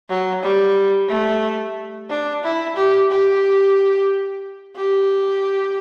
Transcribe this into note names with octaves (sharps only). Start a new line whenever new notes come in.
F#3
G3
A3
D4
E4
G4
G4
G4